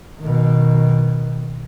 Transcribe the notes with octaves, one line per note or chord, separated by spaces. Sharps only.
B2 D#3